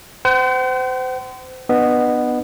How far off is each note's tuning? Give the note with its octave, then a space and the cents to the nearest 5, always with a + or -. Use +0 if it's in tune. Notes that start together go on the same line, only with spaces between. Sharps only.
C5 -30 F#5 +45
B3 +0 D4 +40 D#5 -30